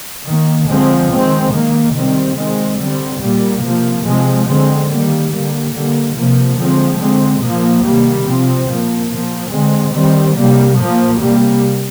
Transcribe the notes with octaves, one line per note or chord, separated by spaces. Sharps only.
D#3 A#3
D3 F3 G#3 C4
D#3 G#3 C4
D#3 A#3
C3 D#3 G3 C4
D#3 G#3 C4
D3 G3 C4
A#2 G3 A#3
C3 F3 A#3
C3 F3 G#3 C4
D3 G#3 C4
D#3 G3 A#3
D3 G3 A#3
D3 G3 A#3
C3 F3 A#3
D3 F3 G#3 C4
D3 G#3 C4
A#2 F3 A#3
C3 D#3 G3 A#3
C3 F3 C4
A#2 F3 A#3
A#2 F3 A#3
D3 G#3 C4
D#3 G3 C4
C3 G3 A#3
A#2 F3 A#3
C3 G3 A#3